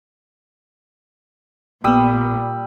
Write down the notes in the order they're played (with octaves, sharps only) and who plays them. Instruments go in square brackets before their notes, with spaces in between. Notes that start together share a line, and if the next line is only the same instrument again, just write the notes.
[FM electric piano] A#1 B3 [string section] A#2 [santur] G3 D#6 E6